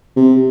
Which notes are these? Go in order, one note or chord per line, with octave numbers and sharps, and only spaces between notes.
C3